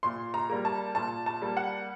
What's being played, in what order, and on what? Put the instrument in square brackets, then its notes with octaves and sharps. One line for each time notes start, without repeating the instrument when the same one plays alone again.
[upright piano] A#2 C6
A#5
G3 A#3
A5
A#2 A5
A5
G3 A#3
F#5